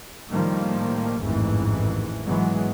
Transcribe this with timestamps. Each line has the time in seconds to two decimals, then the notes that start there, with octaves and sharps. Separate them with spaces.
0.31 A2 D#3 F3 G3 A#3
1.22 A1 F2 G#2 D#3 E3
2.27 G#1 E3 F#3 G#3 B3